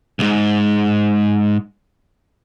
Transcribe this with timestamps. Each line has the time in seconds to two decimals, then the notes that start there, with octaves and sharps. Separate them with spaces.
0.19 C2 G#2